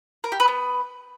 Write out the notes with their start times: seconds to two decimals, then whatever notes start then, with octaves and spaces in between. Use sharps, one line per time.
0.24 A#4
0.32 G4
0.40 B4
0.48 B3